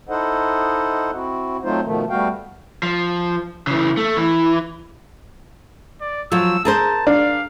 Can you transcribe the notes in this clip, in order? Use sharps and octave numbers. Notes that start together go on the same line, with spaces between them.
D#4 E4 A4 C5 D#5 F#5
C4 E4 F#4
F#3 A3 C4 D#4 F4 C5
B2 D#3 F3 A3
G3 A3 B3 F#4 F5 G5
F3
C#3 E3
A3
E3
D5
F3 F#3 F4 E6
G#4 A#4 C5 A5
D4 F5